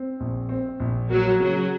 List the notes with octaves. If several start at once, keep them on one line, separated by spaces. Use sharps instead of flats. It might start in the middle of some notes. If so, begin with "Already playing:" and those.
Already playing: C4
A#1
C4
A#1
F#3 A#3
C#3 F#3